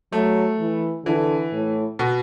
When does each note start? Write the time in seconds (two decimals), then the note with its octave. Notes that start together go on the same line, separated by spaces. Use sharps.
0.12 F#3 A3
0.59 E3
1.05 D3 E3
1.52 A2
1.99 B2